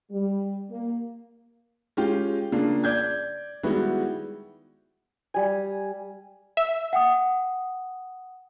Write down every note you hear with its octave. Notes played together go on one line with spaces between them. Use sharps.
G3
A#3
G#3 C#4 F4 G4
C#3 A#3 D4 F4
D5 G6 G#6
D#3 G3 G#3 B3 E4 F#4
G3 G#5
E5
F#5 G5 D#6